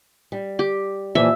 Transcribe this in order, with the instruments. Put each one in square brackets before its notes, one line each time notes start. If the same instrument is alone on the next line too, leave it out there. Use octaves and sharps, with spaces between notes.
[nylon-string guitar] G3
[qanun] G4
[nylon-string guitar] A#2 E3 F3 [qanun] E5